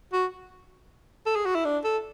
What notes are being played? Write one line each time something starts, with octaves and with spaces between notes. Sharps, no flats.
F#4
A4
G#4
F#4
E4
D4
A4